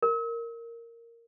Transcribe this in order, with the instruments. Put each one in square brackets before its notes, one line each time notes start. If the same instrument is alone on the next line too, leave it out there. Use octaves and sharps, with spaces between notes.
[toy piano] A#4